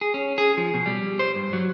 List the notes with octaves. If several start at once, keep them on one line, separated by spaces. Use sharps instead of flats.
G#4
C#4
G#4
F3
B2
G3
C5
G2
F#3